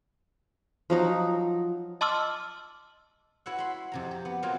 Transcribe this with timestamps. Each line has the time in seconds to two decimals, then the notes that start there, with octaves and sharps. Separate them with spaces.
0.90 F3 F#3 D#4
2.01 D#5 A5 C6 D6 E6 F6
3.46 E4 F#4 B4 C#5 E5 F#5
3.58 B5 C6
3.92 F2 C3 A#5
4.11 G4
4.25 B3
4.43 F3 F#3 A#3 F4